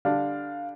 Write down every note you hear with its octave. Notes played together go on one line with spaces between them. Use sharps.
D3 G3 D4 F5